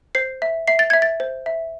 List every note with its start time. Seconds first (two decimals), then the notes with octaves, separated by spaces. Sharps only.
0.15 C5 C7
0.42 E5
0.68 E5 C7
0.79 A6
0.90 E5 G#6
1.02 A6
1.20 C5
1.46 E5